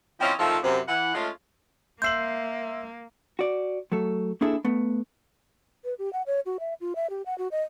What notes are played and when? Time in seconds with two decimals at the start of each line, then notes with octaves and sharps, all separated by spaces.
0.20 F3 C4 C#4 E4 F4 D#5
0.39 D#3 F3 A3 C4 F4 A4
0.63 F#2 C3
0.88 E3 F#5
1.14 G#3 A3 C#4 F4
2.02 A#3 E5 C6 E6 G6 C7 F#7
3.39 F#4 D5
3.92 F#3 A3 A4
4.41 A#3 D4 E4 G#4 A4
4.64 A3 B3
5.85 B4
5.99 G4
6.13 F#5
6.27 C#5
6.46 F#4
6.60 E5
6.81 F4
6.96 E5
7.10 G4
7.26 F#5
7.38 F#4
7.52 D#5